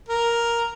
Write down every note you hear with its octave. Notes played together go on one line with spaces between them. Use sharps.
A#4